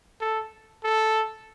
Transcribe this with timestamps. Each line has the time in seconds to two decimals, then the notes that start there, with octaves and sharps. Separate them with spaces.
0.21 A4
0.84 A4